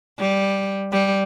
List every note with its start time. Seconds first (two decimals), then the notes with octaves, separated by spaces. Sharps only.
0.19 G3
0.92 G3